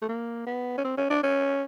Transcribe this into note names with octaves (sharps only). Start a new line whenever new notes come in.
A3
A#3
B3
C#4
C4
C#4
D4
C#4